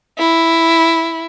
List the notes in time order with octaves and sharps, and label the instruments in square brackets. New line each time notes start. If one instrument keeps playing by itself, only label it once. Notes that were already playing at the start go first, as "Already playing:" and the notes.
[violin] E4